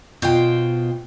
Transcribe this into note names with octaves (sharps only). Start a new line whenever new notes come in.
B2 F4 C5 G5